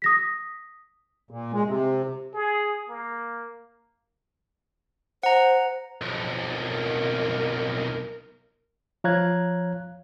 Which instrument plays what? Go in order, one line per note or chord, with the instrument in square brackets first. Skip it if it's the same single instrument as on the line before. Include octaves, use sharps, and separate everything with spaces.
[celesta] D#6 A#6 B6
[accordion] A#2
G#3
C3
[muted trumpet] G#4
A#3
[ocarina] C5 [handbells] F#5 A#5
[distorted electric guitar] B1 F2
[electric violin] A#4
[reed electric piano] F3 C#5 F5 A#5 F#6 G#6